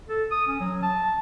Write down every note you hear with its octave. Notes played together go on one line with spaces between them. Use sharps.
A4
D#6
C#4
F#3
A5